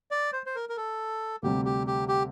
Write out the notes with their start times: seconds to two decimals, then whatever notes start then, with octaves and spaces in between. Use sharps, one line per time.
0.11 D5
0.33 C5
0.46 C5
0.55 A#4
0.69 A#4
0.77 A4
1.43 D2 C3 G3 G4
1.65 G4
1.87 G4
2.08 G4